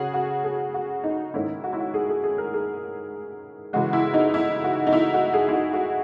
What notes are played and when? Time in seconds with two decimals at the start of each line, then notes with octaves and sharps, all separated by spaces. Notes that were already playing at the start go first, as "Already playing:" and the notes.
Already playing: C#3 C#4 F#4 G#4
0.14 F#4
0.44 G#4
0.74 F#4
1.04 D#4
1.34 G#2 D#3 A#3 C#4 E4
1.64 F#4
1.73 E4
1.80 F#4
1.94 G#4
2.09 G#4
2.23 G#4
2.38 A#4
2.54 G#4
3.73 C#3 E3 G#3 F#4
3.93 E4
4.14 D#4
4.34 E4
4.64 F#4
4.87 D#4
4.93 E4
5.14 F#4
5.34 G#4
5.48 E4
5.53 F#4
5.73 F#4